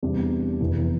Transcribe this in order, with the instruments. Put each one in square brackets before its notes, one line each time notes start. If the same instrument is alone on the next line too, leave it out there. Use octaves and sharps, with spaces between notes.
[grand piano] E2 C3 G3 D4
F1 E2 E3